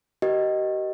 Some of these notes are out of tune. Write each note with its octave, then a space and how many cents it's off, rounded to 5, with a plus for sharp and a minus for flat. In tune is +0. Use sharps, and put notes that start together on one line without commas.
G4 -40 A#4 +20 D#5 +0